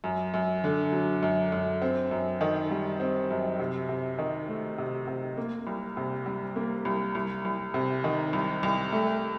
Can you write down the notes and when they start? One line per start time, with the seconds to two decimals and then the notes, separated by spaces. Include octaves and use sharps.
0.04 F#2
0.34 F#2
0.64 D3
0.93 F#3
1.23 F#2
1.52 F#2
1.82 C4
2.11 F#2
2.41 D#3
2.71 G3
3.00 C4
3.30 F#2
3.60 C3
3.89 C3
4.18 D#3
4.48 A3
4.78 C3
5.07 C3
5.37 A#3
5.67 C2
5.97 C3
6.26 G3
6.56 A#3
6.85 C2
7.15 C2
7.45 C2
7.74 C3
8.04 D#3
8.33 C2
8.63 C2
8.92 A3